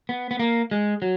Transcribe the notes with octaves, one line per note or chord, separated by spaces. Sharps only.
B3
B3
A#3
G#3
F#3